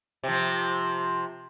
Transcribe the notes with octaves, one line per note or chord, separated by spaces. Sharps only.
C3 F3